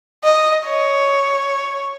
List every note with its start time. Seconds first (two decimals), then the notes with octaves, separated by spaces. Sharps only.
0.24 D#5
0.66 C#5